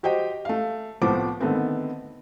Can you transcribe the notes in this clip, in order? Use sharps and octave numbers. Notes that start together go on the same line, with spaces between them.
F#4 G4 C5 D#5 G5
A3 F5
C2 A2 F3 B3 C5 D6
D3 D#3 A3 B3 C4